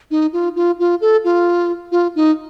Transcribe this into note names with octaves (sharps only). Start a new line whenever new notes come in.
D#4
F4
F4
F4
A4
F4
F4
D#4